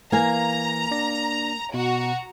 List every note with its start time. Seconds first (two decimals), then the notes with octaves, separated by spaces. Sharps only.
0.12 E3 A#3 F5 G#5 A#5
0.91 D4 D5 A#6
1.74 B2 F#4 A#5